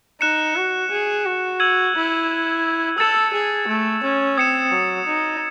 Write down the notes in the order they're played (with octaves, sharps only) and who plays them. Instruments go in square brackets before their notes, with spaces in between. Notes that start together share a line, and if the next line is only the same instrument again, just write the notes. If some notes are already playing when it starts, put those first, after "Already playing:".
[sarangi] D#4 [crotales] F#6 C#7 E7
[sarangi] F#4
G#4
F#4
[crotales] E6 G#6 D#7 F#7
[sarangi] E4
[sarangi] A4 [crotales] E6 A6 C#7 E7
[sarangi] G#4
A3
C#4
[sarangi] C4 [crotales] D#6 G#6 C#7 E7
[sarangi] F#3
D#4